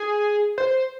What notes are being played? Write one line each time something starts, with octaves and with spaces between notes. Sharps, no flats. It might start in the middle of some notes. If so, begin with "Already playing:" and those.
Already playing: G#4
C5